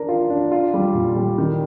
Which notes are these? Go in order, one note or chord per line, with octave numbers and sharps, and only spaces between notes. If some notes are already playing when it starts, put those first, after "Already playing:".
Already playing: D4 A#4
F4
D4
F4
G3
A#2
G3
D#3